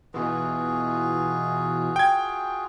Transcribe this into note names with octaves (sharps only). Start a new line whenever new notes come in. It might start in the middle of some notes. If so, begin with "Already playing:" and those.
B2 E3 F4 F#4 G#4
G5 G#6